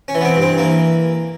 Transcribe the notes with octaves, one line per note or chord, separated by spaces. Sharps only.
C#4
E3
B3
C4
G2
C4
E3 A#3